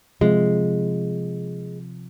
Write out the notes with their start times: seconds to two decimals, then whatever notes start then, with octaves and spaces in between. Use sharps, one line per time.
0.21 C3 F3 G#3